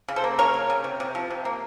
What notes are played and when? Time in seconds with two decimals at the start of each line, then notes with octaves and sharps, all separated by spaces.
0.08 C#3
0.16 A4 C5
0.24 A#3
0.39 C#3 A#4 C#5
0.54 C#3
0.70 C#3
0.84 C3
1.00 C3
1.15 F3
1.31 C3
1.45 A#3